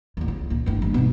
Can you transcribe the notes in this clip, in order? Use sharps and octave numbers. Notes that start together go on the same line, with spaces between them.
D#2 A2
C#2
A#2
G1 A2
G2 G3
B2 D#4